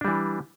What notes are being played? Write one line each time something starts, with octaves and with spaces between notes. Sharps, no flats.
E3 G3 D4